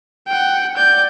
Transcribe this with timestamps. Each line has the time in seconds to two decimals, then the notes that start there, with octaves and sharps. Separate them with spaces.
0.27 F#5 G5
0.77 D5 G6